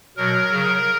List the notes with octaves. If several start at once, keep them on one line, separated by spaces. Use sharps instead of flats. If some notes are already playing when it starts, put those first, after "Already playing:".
B2 F#3 A#4
C#3 F#3